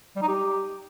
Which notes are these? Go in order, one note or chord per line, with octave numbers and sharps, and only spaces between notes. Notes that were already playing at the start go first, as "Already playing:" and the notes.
G3
D#4
G4